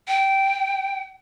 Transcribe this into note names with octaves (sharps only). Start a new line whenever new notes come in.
G5